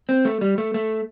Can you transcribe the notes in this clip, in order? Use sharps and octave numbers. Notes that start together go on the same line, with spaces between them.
C4
A3
G3
A3
A3